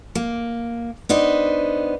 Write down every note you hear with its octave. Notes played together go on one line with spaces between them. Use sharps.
A#3
B3 D4 D#4 C5